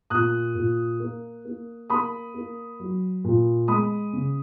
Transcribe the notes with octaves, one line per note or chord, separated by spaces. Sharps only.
A#2 D#6 F#6
A#2
A#3
A#3
A#3 B5 D#6
A#3
F#3
A#2
G#3 B5 D#6
C#3